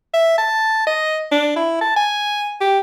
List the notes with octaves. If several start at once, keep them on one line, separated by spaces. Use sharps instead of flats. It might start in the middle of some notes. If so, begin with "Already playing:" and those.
E5
A5
D#5
D4
E4
A5
G#5
G4